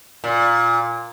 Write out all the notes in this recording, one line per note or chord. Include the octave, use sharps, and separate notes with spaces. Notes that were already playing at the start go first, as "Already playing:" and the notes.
A#2